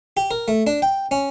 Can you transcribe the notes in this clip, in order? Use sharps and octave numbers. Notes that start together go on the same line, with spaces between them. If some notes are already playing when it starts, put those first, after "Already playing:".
G4
A#4
A3
D4
G5
C#4